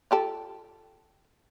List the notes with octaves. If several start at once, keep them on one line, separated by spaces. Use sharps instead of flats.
F4 G4 A4